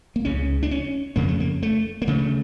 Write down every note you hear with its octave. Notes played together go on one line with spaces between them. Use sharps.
A#3
C#2 C#3 C#4
D4
C#4
F2 C#3 A#3
A3
A#3
A3
A#3
D2 C#3 A3